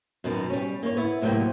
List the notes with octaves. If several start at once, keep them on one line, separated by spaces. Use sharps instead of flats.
F#2 B2 D#3
G3 C#4
A#3 C#5
B3 E4
A2 C3 F#3 A#3 G5